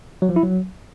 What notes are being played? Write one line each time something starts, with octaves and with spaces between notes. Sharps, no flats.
F#3
F3
E4
F#3